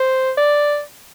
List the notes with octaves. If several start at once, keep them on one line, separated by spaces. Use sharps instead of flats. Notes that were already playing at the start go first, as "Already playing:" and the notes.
Already playing: C5
D5